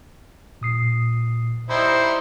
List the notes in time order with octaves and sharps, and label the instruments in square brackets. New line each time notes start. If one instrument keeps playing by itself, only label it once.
[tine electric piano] A#2 D#6 C7
[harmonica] G3 D#4 E4 [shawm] C5 [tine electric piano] B5